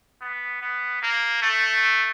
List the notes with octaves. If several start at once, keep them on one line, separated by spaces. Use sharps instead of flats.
B3
B3
A#3
A3